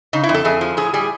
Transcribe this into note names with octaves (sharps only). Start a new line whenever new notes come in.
C#3 D#4
E4
F2
A4
F2 G#4
F3
A2 G#4
G3 G#4